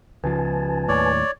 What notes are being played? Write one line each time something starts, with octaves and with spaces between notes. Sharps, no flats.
C#2 C#3 F3 B4 G#5 A5
D#2 A2 C#5 D5